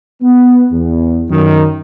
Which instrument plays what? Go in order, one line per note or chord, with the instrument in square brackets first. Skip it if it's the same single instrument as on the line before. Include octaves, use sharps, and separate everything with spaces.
[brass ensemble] B3
E2
F#2 D#3